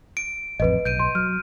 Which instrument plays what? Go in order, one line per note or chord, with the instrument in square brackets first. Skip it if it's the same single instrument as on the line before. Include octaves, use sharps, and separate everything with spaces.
[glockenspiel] D7
[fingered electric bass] A1 F2 [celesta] B4 D#5
[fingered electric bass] B1 [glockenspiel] G6 D7 D#7
[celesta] C6
[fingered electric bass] F#3 [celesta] F6